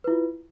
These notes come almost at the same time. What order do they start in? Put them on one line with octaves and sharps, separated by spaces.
B4 E4 F4